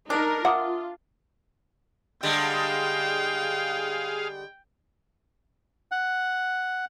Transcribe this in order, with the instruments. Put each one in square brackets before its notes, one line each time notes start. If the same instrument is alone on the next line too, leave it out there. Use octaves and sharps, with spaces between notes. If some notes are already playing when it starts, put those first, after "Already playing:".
[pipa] D4 [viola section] D#4 A#4
[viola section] F4 [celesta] E5 D6 D#6 [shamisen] F#5
[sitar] D3 G3 G#3 [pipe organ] G#4 F5 [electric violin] G5
[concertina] F#5